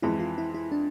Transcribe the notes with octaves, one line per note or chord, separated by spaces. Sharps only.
F2 E3 G#3 E4
F4
E4
E4
D4